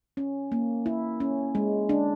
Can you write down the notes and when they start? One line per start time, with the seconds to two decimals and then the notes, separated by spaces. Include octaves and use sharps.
0.17 C#4
0.52 A#3
0.86 E4
1.20 C#4
1.55 G#3
1.89 D4